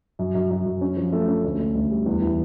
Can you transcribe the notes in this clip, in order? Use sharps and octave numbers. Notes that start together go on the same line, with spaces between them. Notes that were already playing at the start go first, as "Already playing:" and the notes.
F#2
F#2
F#2
F#2
C#4
F3
A3
C#4
D2
D2
D2
G3
E2
E3